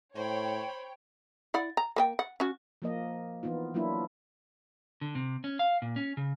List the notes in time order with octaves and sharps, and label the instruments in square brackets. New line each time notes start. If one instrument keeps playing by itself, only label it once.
[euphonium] A2 [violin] C5 B5 [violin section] C#5 G5
[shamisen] E4 D5 F#5
A#5
A#3 B4 G5
F#5
C#4 F#4
[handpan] F3 A#3 D#5
E3 B3 D#4 F4
F#3 A#3 D4 E4 F4
[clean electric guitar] D3
C3
C#4
F5
A#2
C#4
C#3